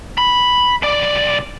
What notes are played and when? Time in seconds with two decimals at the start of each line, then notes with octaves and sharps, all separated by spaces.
0.18 B5
0.82 B1 D5